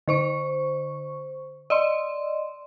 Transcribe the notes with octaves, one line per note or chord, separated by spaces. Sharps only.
D3 C5 C#6
D5 D#5 C6